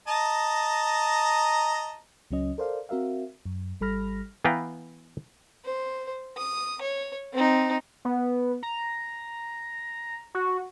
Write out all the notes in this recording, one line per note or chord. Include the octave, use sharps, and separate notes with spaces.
D#5 A5 A#5
C#2 F#3 C#4 D#5
A4 A#4 C5 D5 F5
C4 F#4 A#4 E5 F5
F#2
G#1 G3 A4 B5 F6 A#6
E3 B3 B4 F5 G5 A#5
C5
D#6
C#5
C4 D#4
B3
A#5
F#4